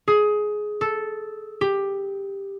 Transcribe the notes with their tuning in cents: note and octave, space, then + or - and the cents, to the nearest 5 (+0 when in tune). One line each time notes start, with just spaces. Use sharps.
G#4 +15
A4 -5
G4 +10